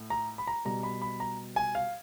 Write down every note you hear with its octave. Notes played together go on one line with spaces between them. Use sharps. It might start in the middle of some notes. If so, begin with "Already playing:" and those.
Already playing: A2 A3
A#5
B5
A#5
B2 G3 A#5
B5
B5
A#5
G#5
F5